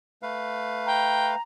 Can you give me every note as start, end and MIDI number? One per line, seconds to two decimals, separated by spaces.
0.23 1.35 57
0.23 1.35 71
0.23 1.35 77
0.86 1.36 79
0.86 1.42 82